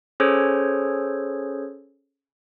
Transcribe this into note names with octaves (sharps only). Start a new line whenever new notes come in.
C#4 G#4 A4 C5 C#5